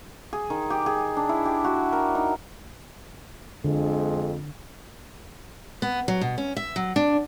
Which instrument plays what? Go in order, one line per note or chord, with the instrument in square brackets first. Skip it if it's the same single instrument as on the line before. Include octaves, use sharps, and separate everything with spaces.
[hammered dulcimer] G#4
D#3
G4
G#4
D4
E4
G4
F#4
A#4
D#4
[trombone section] F2 G#3 [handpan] D3
[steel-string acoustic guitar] B3
F#3
B2
C#4
E5
F#3
D4